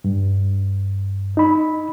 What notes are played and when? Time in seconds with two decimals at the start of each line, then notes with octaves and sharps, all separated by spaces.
0.04 G2
1.37 D#4 B5